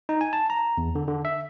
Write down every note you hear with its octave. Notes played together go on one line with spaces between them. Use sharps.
D#4
G#5
A5
A#5
E2
D3
D3
E5